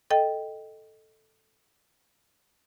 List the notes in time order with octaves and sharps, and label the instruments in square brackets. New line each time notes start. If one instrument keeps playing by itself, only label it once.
[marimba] A4 D#5 G5